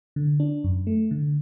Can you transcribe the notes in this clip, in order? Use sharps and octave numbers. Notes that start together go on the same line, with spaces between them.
D3
D4
F#2
A3
D3